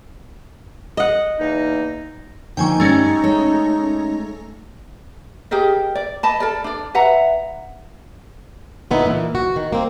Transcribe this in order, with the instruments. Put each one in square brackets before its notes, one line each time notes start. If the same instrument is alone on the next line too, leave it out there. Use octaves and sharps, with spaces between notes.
[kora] D#5 F#5
[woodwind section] E2 A#3 D#4
[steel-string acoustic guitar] D3 F3 A#3 [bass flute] D#4 [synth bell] G5 G#5 C#6
[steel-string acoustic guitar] G2 G3 [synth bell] A3 C#4 A#6
[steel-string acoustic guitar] G#3 A4 C#5
[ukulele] G4 G#4 A#4 D#5
D5
D#5 A5 B5
A4 A#4 D5
D4 D5
B4 E5 F#5 A#5
[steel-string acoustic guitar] A#2 D3 B3 D#4 E4
A#2 E3
F#4
D#3
A#3 C4